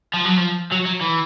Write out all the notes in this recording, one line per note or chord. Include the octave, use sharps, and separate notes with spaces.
F3
F#3
F3
F#3
F#3
E3